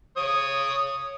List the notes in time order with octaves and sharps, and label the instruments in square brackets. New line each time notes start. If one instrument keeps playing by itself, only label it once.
[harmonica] C#5 D#6